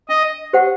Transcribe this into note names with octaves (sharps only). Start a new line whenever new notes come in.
D4 D#5
G4 C5 F#5